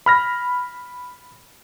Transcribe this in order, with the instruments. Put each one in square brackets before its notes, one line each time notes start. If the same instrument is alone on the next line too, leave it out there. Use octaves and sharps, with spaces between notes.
[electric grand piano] B5 F6 A#6